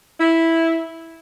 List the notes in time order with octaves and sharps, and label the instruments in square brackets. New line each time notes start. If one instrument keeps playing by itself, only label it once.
[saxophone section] E4